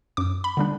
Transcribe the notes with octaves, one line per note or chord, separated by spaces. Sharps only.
F#2 D6
B5
D3 G3 D4